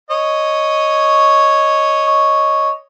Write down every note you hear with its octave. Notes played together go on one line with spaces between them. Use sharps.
C#5 D#5